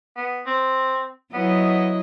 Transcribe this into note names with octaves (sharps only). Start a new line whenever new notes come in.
B3
C4
F#3 B3 E4 D#5